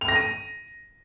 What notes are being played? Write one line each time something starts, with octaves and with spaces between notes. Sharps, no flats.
F7
A#6
D#7